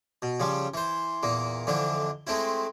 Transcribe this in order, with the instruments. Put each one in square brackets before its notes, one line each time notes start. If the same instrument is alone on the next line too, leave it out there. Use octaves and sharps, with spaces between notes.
[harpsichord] B2
C#3 F3 G3
E3 C5
E2 A#2 A#3
F2 D3 E3 D4
G#3 A3 C4 E4